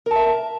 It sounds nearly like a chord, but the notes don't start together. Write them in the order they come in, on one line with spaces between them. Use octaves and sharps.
A#4 A5 E5